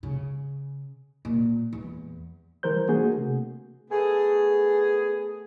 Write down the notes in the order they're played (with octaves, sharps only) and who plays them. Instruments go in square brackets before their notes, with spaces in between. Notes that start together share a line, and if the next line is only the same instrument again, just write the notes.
[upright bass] C#3
A#2
E2
[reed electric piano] E3 G3 A#4 C5 G6
A3 A#3 D4 F#4 G#4
C3
[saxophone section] A3 B3 G#4